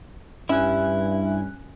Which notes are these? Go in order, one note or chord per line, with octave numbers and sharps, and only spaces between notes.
G2 C#4 E4 E5 G#5 F#6